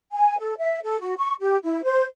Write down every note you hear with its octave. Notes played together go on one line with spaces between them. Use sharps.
G#5
A4
E5
A4
F#4
C#6
G4
E4
C5